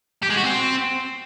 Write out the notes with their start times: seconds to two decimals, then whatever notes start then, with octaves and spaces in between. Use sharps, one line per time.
0.22 G4
0.29 G#3
0.36 F#4
0.43 C4